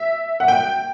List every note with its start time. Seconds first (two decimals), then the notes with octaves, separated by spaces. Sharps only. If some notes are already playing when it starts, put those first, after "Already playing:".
Already playing: E5
0.40 F#5
0.48 G5